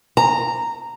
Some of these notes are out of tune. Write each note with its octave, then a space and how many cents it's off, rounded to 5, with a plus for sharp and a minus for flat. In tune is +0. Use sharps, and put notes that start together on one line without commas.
A#5 -10